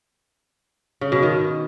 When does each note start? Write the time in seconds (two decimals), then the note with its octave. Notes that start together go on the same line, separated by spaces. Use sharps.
1.01 C#3
1.12 B2
1.22 D#3